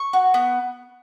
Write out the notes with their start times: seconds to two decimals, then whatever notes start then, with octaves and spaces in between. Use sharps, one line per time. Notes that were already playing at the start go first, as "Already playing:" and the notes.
Already playing: C#6
0.13 F#4
0.34 B3